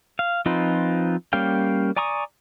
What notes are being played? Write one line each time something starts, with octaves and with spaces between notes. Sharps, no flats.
F5
F3 C4 D#4 F4 B4
G3 A#3 C#4 F5 G5
D5 G#5 A#5 C#6 D#6